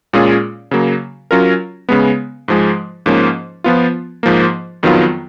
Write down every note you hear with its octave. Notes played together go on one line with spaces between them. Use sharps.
A#2 G#3 C#4 F4 G#4
C#3 F#3 A#3
F#3 C#4 F4 A#4
C#3 G#3 B3
G#2 F3 G#3
G#2 F3 A#3 C#4
F3 B3 F4
G#2 F3 A#3
F2 D#3 F#3 B3 F4